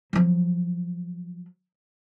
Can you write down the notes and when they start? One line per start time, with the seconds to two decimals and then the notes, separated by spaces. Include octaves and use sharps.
0.13 F3 F#3